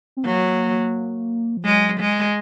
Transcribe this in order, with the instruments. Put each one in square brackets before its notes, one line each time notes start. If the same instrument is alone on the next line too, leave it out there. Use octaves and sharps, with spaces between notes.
[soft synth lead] C4
[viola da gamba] F#3 [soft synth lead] A#3
[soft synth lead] F3
[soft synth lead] F#3 [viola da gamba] G#3
[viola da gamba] G#3